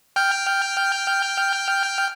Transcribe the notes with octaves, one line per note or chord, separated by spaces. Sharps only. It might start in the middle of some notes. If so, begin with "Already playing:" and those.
G5 F6 G6